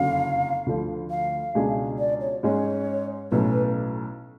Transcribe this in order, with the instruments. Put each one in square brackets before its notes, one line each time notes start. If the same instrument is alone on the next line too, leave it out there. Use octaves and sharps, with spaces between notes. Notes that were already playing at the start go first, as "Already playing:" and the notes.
Already playing: [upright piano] F#1 F2 D3 F#3 C#4 [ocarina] F5
[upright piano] D2 D3 F3
[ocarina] F5
[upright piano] C#2 B2 G#3 D4 G#4
[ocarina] D5
C#5
[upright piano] G#2 G#3 C#4 G#4 [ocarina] C#5
[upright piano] B1 A2 F#3 C#4 [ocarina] B4